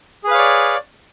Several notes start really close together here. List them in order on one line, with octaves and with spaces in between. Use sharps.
G#4 B4 F5 C#5 D5